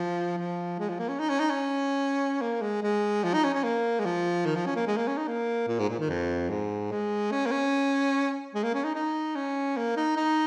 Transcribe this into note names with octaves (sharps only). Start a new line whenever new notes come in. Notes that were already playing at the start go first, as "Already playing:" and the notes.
Already playing: F3
F3
G#3
F3
A#3
C#4
D#4
C#4
D#4
C#4
A#3
G#3
G#3
F3
D#4
C#4
C#4
A#3
G#3
F3
D#3
F3
C#4
A#3
G#3
A#3
C#4
D#4
A#3
A#2
G#2
A#2
D#3
F2
G#2
G#3
C#4
A#3
C#4
G#3
A#3
C#4
D#4
D#4
C#4
A#3
D#4
D#4